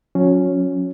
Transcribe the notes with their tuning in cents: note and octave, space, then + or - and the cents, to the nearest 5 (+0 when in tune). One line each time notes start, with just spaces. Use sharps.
F#3 -40 C#4 +0